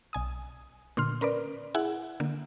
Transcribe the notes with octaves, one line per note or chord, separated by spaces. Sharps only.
B1 G#5 D#6
A#2 D3 C6 F6
C#4 A#4 B4 D5
E4 G#4 F#5
D3 A#3